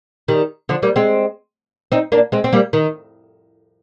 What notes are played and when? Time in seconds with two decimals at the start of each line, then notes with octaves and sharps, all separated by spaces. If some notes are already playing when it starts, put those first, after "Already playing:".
0.28 D#3 G3
0.69 D3 F3
0.82 G3 A#3
0.96 G#3 C4
1.92 C4 D#4
2.12 A#3 D4
2.32 G#3 C4
2.44 C4
2.53 G3 A#3
2.73 D#3